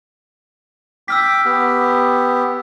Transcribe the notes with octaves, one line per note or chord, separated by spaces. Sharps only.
G5 D6 E6 F6 B6
B3 G4